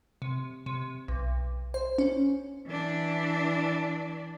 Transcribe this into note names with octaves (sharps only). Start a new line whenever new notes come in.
C3
C3
B1
C5
C#4
E3 D4